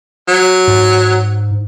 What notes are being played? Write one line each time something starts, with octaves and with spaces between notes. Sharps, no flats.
F#3
G#2